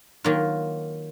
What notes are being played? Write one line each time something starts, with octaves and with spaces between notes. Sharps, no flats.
D#3 F#3 A#3 F4